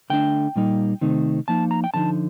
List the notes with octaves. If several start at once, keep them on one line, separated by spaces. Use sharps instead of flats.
D3 A3 D4 G5
A#2 G3 A#3 D#4
C3 D#3 A3 C4 D#4
F3 A#3 D#4 A5
A#5
G5
D3 F3 A#3 D#4 A5